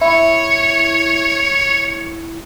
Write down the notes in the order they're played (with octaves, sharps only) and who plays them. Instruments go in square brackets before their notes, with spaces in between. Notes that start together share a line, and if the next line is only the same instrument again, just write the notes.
[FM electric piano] E4 [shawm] C#5